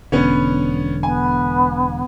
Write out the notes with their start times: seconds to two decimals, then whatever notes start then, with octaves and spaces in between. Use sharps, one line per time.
0.12 E1 D3 B3 C#4 C#5
1.03 B3 G#5